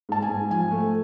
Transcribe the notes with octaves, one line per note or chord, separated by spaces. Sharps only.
G#2 A5
G#5
G#2
F3 G#5
A3